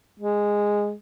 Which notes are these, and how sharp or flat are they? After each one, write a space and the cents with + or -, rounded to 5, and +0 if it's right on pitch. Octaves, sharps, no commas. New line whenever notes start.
G#3 -10